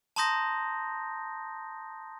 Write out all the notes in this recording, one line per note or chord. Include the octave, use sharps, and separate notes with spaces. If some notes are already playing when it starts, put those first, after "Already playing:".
A5 A#5 C6 D#6 G6 A#6